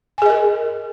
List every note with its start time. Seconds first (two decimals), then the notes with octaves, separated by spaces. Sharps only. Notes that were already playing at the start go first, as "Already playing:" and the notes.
0.18 G#5
0.22 G#4
0.26 D#5
0.30 A#4